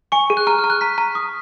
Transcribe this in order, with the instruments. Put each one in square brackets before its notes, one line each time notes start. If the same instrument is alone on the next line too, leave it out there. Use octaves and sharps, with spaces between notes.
[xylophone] G#5 [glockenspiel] C#6
[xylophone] G#4
[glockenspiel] F#6
[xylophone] A#5 [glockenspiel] F6
[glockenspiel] F6
[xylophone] A#5
[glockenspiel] F#6
[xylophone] A#5 [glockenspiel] B6
[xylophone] A#5
D#6